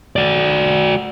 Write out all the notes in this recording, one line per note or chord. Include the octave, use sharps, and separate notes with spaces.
F#4 D5